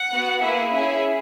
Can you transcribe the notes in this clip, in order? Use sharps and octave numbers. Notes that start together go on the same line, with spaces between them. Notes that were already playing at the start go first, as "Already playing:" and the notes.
Already playing: F#5
B3 F#4
A#3 E4 G#4 E5
C#4 E4 G#4 E5